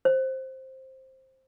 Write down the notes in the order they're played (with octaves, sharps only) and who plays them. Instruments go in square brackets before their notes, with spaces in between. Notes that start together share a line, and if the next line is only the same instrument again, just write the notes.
[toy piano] C5